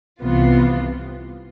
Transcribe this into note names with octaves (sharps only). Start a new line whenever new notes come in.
C2 C3 E3 B3 F4